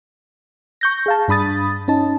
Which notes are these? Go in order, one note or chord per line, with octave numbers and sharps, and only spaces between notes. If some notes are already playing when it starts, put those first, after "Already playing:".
C#6 G6 A#6
G#4 F5 A5
G2 D4 B5 D#6 A6
C#4 D#4 A5